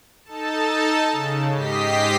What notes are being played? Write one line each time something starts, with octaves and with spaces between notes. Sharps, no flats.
D#4 A4 A5
C#3
G#2 G4 D#5 B6 C7